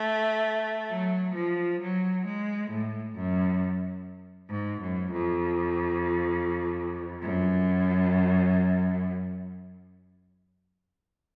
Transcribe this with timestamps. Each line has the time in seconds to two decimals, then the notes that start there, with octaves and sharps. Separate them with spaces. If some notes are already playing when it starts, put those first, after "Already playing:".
Already playing: A3
0.89 F#3
1.34 F3
1.80 F#3
2.25 G#3
2.70 A2
3.15 F#2
4.51 G#2
4.80 F#2
5.11 F2
7.21 F#2